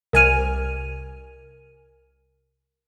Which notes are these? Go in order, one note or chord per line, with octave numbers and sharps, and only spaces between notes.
C2 A#4 G#5 F6 D#7